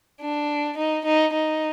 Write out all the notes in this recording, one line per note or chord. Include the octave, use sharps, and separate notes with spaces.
D4
D#4
D#4
D#4